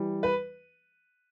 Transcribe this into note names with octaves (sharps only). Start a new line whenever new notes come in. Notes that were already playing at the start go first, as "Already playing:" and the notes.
Already playing: E3 G3
B4